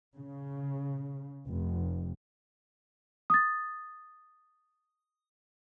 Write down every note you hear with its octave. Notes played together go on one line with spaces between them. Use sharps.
C#3
F1
D#6 A6